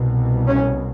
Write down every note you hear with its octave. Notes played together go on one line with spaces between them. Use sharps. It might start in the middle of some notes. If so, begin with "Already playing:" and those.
Already playing: C2 B2
C#4